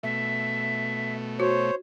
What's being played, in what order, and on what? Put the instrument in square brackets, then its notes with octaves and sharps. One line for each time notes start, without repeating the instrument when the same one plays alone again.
[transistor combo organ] B2 A3 [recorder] E5
[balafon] F#4 [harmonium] C5 C#5